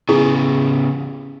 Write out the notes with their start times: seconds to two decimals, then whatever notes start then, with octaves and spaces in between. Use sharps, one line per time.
0.09 C#3 B3 E4 G#4